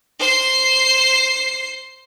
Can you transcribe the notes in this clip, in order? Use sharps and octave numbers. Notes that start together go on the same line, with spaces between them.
C5 C7